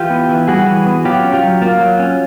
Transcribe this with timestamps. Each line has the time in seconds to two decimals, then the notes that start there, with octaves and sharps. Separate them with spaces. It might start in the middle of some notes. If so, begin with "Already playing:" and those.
Already playing: E3 F4 G4
0.10 B3
0.29 E3
0.48 G3 F#4 G#4
0.67 E3
0.86 B3
1.05 F#3 F4 G4
1.23 C#4
1.33 F4 G4
1.43 F#3
1.62 A#3 F4
1.80 F#3
1.99 C#4